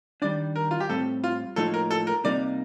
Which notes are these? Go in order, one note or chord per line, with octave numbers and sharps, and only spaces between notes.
D#3 G3 D4 D5
A#4
F4
G4
A2 G3 C4 A4
F4
A2 F3 A#3 D#4 A4
A#4
A4
A#4
C3 G3 A#3 D#4 D5